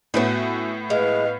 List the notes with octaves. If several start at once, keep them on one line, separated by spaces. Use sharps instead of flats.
A2 A3 B3 C#4 F#4
G#3 B4 F5